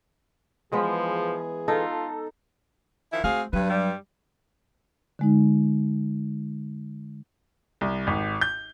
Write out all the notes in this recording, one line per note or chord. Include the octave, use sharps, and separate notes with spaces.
E3 F3 G#3 B3 G#4
D#4 F4 A4
D#3 F3 E4
A3 C4 F#4 G#4 F5
G2 F#3 B4
G3
D3 G#3 D#4
C2
G#1
G6